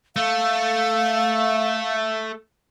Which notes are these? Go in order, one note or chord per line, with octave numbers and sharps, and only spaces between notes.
A3 F5